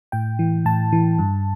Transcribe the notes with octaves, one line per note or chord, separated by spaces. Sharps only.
A2 G5
E3
A2 A5
E3
G2